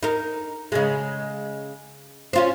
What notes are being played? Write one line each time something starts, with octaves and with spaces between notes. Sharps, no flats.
D#4 A#4
C#3 G#3
C#4 F4 C5